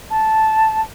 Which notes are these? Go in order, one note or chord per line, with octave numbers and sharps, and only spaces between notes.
A5